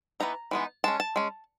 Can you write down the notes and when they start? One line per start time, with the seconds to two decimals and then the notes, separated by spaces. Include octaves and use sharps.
0.20 E3 G#3 B3 D#4 A#5
0.51 E3 G#3 B3 D#4
0.84 G#3 C#4 A5
1.00 A5
1.16 G#3 C#4